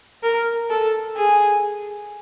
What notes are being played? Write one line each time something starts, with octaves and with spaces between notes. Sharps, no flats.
A#4
A4
G#4